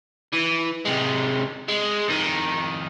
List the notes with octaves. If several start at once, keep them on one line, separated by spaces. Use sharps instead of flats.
E3
C3 G#3
G#3
F2 D#3